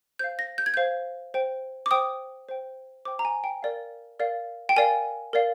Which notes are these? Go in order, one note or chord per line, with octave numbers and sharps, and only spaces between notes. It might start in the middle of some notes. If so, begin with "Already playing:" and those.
C5 F5 G6
A#6
G6
G#6
C5 F5 G6
C5 G5
D6
C5 G5 D#6
C5 G5
C5 G5 D6
A#5
G#5
G5
A#4 D5 F5
A#4 D5 F5
G5
A#4 D5 F5 G#5
A#4 D5 F5